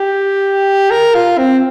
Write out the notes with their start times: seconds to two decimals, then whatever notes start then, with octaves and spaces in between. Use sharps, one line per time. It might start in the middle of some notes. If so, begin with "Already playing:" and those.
Already playing: G4
0.91 A#4
1.15 F4
1.38 C4